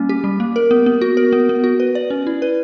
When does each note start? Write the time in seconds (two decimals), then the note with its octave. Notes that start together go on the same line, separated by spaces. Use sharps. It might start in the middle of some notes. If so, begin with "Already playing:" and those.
Already playing: G3 A#3 C#4
0.09 G4
0.24 G3
0.40 A#3
0.56 A#4
0.71 B3
0.86 B3
1.02 F#4
1.17 A#4
1.33 B3
1.49 B3
1.64 F#4
1.80 B4
1.95 D5
2.10 C#4
2.27 E4
2.42 B4